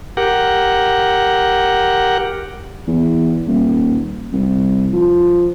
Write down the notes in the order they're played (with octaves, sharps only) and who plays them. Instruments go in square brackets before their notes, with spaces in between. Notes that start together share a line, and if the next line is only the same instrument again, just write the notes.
[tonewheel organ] G4 A#4 F#5
[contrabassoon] E2
D#1
C2
F3